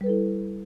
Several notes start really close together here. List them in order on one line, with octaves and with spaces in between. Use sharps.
G3 B4 A4 E4